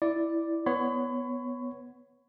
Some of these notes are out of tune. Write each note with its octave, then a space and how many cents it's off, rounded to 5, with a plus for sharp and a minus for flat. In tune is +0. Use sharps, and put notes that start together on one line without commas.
E4 +0 D5 +0
B3 +0 C#5 +0 B5 +35